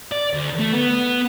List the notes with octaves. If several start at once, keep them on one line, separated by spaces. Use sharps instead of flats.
D5
D2
A3
B3